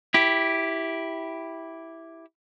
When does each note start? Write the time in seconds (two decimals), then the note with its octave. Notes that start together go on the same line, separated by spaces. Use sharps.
0.14 E4 G4